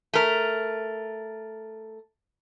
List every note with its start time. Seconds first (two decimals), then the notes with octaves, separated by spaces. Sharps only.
0.14 A3 A#4